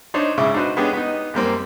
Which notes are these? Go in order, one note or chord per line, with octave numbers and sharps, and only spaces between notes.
D4 D#4 C5 C#5
G#2 C#3 E4 D6
D4 D#4 F#4 B4 C5
G#3 B3 C#4 D4 G4 G#4
B3 D#4
F#2 G3 A#3 C4